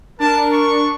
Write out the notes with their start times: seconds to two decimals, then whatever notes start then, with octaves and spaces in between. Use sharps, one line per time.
0.20 D4 A#4 A5
0.53 C#6